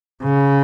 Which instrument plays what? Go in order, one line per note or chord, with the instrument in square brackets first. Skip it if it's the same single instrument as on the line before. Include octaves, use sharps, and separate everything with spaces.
[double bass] C#3